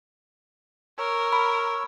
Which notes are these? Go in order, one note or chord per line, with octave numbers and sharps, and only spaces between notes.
A#4 C#5 E6
B5